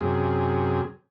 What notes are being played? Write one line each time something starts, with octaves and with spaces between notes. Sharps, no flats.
F#2 C3 G#4